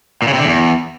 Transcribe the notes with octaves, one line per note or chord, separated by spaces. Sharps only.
A#2
C#3
C3
D3
E2